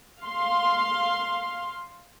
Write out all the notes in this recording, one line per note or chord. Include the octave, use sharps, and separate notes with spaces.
F5 C6